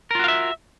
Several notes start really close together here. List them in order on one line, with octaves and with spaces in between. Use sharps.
A#4 F4 F#4 F5 E5